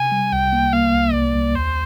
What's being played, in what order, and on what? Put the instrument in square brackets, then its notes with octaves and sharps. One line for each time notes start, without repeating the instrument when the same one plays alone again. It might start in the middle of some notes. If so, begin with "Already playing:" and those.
Already playing: [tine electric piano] C3 [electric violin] G#5
[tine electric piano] G3
[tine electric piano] C2 [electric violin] G5
[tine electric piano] A#3
[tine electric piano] A#3 [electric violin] F5
[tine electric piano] C2
[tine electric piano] C2 [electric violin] D5
[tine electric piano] C2
[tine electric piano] D#2 [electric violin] C5